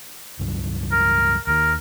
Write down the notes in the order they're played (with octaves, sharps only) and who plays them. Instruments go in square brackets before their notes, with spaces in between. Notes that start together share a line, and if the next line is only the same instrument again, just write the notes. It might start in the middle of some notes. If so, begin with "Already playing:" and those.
[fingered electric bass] C#2 G2 F#3
[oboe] A#4
[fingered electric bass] D#2 D#3 [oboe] A#4